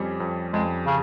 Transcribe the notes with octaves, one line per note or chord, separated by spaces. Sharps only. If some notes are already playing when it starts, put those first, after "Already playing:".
Already playing: F2 G3 C#4
F2
F2 G#3
C#3